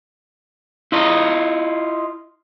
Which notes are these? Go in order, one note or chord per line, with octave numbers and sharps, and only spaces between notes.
E4 F4 D#5